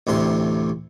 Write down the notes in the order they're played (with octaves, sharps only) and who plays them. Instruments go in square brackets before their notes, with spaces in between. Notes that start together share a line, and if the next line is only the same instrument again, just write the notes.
[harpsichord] A1 D2 C3 C6